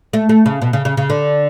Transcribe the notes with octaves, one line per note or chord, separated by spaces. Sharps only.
A3
A3
C#3
B2
C#3
C#3
C#3
D3